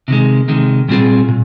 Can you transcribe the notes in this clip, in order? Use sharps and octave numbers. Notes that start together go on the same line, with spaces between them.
C3 D#3 G#3
C3 D#3 G#3
A#2 G3 C4 F4 G#4
A#2